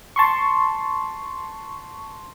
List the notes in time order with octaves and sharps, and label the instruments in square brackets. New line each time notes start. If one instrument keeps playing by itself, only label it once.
[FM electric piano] A5 C6 C#6